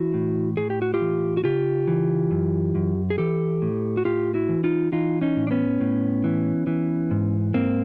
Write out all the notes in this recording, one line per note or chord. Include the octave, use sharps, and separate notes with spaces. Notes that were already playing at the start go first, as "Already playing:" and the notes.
Already playing: E3 E4 F#4
A2
A2 G#4
G4
F#4
F4 G4
E3
F#4
C#3 F4 G4
E3
F#2
F#2
G#4
E3 G4 A4
A2
F#4
A2 F4 G4
E4 F#4
E3
D#4 F4
E3 D#4 F4
C#4 D#4
A2
D4
B3 C#4
A2
E3
E3
G#2
G#2 A#3 C4